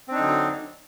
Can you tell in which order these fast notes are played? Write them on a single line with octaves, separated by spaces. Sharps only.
C4 D4 D#4 D3 F#3